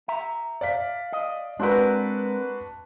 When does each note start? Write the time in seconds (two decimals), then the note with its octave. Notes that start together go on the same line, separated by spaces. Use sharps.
0.08 E5 A#5
0.61 D5 F5 B6
1.12 D#5
1.60 G#3 C4 D4 F#4 A#4 B4